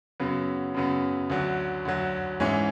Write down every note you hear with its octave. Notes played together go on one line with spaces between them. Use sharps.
F#2 C#3 F#3 B3
F#2 C#3 F#3 B3
D2 D3 F#3
D2 D3 F#3
G#2 E3 G#3 C#4 E4